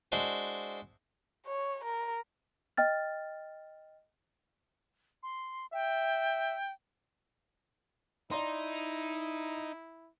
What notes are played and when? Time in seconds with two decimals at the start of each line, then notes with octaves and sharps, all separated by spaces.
0.12 G#3 D4 E4 F#4 C5
1.46 C#5
1.84 A#4
2.77 D#5 G5 F6 A6
5.23 C6
5.73 E5 G5
8.31 D#4 E4 D5 A#5 C6